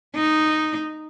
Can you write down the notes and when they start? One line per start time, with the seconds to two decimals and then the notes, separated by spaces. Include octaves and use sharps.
0.16 D#4